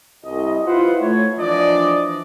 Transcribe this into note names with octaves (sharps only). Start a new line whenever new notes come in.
C2 D#5
E4 F4 B4 C5 F#5
A3 C#5
E3 F3 D4 D5 D#5